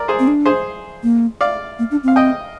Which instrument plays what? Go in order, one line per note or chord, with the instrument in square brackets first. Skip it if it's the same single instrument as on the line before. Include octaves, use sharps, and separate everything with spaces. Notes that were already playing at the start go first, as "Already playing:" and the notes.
Already playing: [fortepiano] A#4 D5
G#4 C5
[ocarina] C4
D4
[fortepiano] G#4 C5
[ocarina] A#3
[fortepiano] D5 F5
[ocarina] A#3
D4
[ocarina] C4 [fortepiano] F5
[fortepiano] D#5 G5